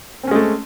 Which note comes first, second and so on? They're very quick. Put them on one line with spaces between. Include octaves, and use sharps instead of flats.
C4 C#4 G#3 A3